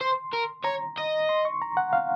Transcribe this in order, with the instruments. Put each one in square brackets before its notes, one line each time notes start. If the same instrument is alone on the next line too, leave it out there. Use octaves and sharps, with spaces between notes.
[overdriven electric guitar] C5 [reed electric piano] C6
[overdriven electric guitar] A#4
[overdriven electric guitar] C#5 [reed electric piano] A#5
[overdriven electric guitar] D#5
[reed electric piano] C6
C#6
A#5
F#5
F5